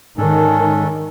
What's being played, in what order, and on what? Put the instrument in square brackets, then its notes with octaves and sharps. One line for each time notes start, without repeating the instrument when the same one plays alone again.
[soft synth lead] G#2 [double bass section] D#3 [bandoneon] C#4 D4 A4